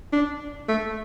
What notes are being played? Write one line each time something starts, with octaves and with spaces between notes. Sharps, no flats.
D4
A3